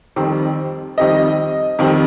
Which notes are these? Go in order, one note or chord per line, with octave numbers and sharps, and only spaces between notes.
F2 D#3 G3 C4
F2 D#3 G3 C4 D#5
F2 D#3 G3 C4